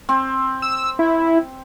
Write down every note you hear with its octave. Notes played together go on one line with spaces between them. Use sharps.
C4
E6
E4